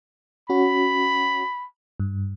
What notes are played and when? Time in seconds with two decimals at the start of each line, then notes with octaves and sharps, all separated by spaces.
0.50 C#4 F#4 B5
2.00 G2